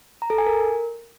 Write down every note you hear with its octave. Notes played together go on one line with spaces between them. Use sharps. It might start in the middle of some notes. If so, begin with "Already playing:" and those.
A#5
A4
G#5
A#4